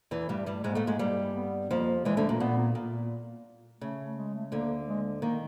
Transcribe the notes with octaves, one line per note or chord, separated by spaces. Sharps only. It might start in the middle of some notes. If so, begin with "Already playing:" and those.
E2 E3
G2 G3 A3
G2 G3
G#2 G#3 A#3
A2 A3
G#2 G#3
G2 G3
B3
F2 F3 A#3
E2 E3 G#3
D2 D3 A3
A#2 A#3
A#2 B3
A#3
A#2
C#3 A3
G#3
A3
D2 D3 A#3
G#3
D#3 A#3